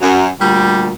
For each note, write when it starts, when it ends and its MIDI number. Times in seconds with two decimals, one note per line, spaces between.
0.02 0.28 42
0.40 0.93 38
0.40 0.93 46
0.40 0.93 55